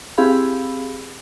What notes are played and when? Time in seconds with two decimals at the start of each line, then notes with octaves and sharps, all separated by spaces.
0.18 C4 E4 G4 G#4 F5 B5